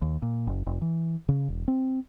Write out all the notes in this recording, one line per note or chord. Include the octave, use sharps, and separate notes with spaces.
D#2
A#2
F#1
F1
E3
C#3
E1
C4